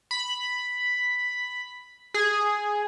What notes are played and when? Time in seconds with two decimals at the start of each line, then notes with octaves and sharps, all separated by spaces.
0.11 B5
2.14 G#4